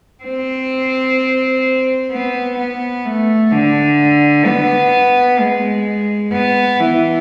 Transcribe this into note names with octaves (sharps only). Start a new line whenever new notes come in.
C4
B3
B3
A3
D3
B3
G#3
B3
E3